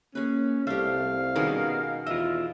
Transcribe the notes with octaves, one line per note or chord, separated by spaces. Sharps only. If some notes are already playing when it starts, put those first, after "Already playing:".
A#3 C#4 G#4 B4
C2 A3 G4 F5
B2 D#3 B3 C#4 G#4 A#4
E2 F4 D#5 E5